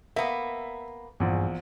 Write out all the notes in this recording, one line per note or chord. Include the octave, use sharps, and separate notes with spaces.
A#3 B3 E5
A#1 E2 G2